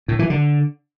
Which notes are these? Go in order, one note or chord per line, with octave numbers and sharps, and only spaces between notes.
A2
E3
D3